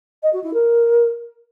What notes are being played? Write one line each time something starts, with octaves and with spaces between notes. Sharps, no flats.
D#5
F#4
E4
A#4